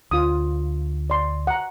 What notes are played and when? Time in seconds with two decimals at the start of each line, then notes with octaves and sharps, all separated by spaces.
0.11 D2 F4 D#6
1.10 D5 C6
1.47 F#5 A#5